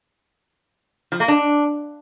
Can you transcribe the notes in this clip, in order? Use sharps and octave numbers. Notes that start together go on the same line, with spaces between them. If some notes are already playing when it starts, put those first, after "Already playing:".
F3
A#3
D4